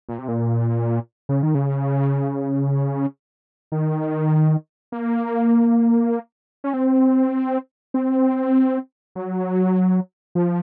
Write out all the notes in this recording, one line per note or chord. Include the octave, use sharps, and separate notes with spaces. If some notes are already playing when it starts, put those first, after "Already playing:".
A#2
C3
A#2
C#3
D#3
C#3
D#3
A#3
C#4
C4
C4
F#3
F3